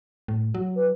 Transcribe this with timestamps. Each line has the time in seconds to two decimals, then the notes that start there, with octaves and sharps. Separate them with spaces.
0.28 A2
0.55 F#3
0.76 B4